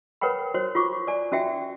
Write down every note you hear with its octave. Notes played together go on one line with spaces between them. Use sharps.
A#4 B4 C#5 F#5 G5 B5
F#4 C5 C#5
F4 F#4 C#6 D6
D5 G#5
C#4 F#4 E5 G5